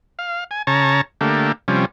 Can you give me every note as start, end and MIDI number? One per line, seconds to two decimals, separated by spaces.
0.19 0.44 77
0.51 0.62 80
0.67 1.01 49
0.67 1.01 73
0.67 1.01 81
0.67 1.01 82
1.21 1.52 50
1.21 1.52 57
1.21 1.52 58
1.21 1.52 67
1.68 1.85 48
1.68 1.85 53
1.68 1.85 55
1.68 1.85 61